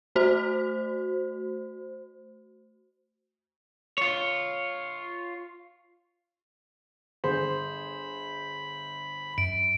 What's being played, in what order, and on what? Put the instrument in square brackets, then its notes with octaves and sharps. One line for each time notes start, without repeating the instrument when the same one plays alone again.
[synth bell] A3 F#4 C5
[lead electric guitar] F4 C#5
[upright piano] G1 G#4 C5 [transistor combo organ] B5
[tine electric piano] F#2 [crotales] D7